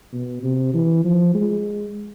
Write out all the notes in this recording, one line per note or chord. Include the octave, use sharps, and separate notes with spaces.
B2
C3
E3
F3
G#3